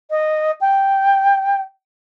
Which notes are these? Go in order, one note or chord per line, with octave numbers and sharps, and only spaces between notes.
D#5
G5